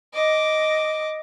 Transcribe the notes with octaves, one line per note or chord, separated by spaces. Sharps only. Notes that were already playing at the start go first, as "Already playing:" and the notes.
D#5 D6